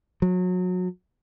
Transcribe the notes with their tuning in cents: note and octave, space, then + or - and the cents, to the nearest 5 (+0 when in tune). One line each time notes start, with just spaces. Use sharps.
F#3 -30